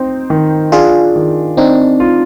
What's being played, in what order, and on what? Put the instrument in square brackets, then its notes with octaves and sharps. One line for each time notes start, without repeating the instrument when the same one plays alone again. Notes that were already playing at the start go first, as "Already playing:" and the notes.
Already playing: [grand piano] C4 D#4
D#3
[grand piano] D4 [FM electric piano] F4 G#4
[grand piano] D#3
[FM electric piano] C4 D#4 [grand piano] D4
[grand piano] F4